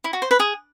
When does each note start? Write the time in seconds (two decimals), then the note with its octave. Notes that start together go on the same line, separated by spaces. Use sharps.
0.04 E4
0.13 F#4
0.22 C5
0.31 B4
0.40 G#4